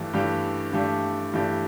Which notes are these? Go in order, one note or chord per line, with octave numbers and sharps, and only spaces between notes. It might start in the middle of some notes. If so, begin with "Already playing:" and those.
Already playing: G2 E3 A3 D4 G4
G2 E3 A3 D4 G4
G2 E3 A3 D4 G4
G2 E3 A3 D4 G4